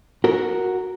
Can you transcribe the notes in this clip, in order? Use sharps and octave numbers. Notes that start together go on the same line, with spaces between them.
F#4 A#4